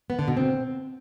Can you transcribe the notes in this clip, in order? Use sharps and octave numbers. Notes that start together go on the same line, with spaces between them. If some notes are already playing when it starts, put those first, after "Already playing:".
B3
D3
B2
C4